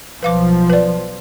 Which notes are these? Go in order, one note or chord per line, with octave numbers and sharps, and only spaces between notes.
B1 F3 B4 F5 D6
B4 D5